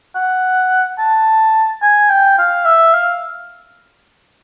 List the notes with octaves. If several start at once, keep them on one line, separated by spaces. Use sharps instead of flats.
F#5
A5
G#5
G5
F5
E5
F5